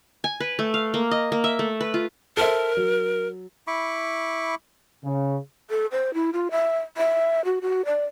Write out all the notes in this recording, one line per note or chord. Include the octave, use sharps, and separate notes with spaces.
G#5
B4
A3
F5
A#3
D#5
A#3
E5
A3
B4
F4
A4 A#4 C5 E5
F#3
E4 B5 C#6 D6
C#3
A4
C5
E4
F4
E5
E5
F#4
F#4
D5